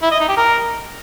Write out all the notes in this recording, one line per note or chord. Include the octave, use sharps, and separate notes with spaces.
E4
D#5
D#4
G4
A#4